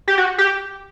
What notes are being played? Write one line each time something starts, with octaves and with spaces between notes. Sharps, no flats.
G4
F#4
G4